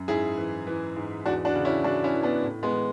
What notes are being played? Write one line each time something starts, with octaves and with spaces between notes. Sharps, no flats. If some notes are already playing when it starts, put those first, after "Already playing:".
Already playing: F#2
G#2 E4 G#4
E3
E3
G#2
E2 D4 F#4
D4 F#4
C#3
C#4 E4
E2 D4 F#4
C#4 E4
E3
B3 D4
A2
G#3 B3
E3